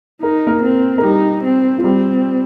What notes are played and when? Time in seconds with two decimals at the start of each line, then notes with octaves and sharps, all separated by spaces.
0.22 D#4 A#4
0.47 A#3 A#4
0.62 C4
0.98 A#4
1.03 G3 D#4 G4
1.44 C4
1.78 F4
1.84 G3 C4 G4